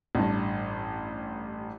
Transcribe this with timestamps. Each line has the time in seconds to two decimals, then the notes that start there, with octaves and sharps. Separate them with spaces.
0.15 A1 G2